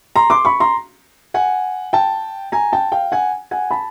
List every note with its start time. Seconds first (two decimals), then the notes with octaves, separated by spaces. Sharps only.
0.16 A#5 C6
0.30 C6 D6
0.45 B5 C#6
0.60 A#5 C6
1.34 F#5 G#5
1.93 G5 A5
2.52 G#5 A#5
2.73 G5 A5
2.92 F5 G5
3.12 F#5 G#5
3.51 F#5 G#5
3.71 A5 B5